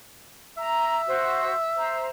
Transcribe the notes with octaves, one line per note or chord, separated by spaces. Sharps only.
E5 A#5
F#4 C5
C5 A#5